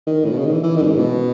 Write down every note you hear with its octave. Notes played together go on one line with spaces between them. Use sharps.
D#3
A2
B2
C#3
D#3
E3
E3
D#3
F#2
G#2
B2